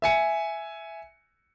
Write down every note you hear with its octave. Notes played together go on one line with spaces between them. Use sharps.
E5 G#5 C#7